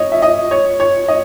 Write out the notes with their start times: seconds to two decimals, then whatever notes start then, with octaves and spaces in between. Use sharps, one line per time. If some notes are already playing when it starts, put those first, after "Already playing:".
Already playing: C#5 D#5
0.12 E5
0.22 D#5
0.51 C#5
0.80 C#5
1.08 D#5